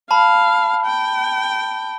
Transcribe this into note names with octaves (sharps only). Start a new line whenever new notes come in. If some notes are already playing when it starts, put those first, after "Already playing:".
F5 A5 B5
G5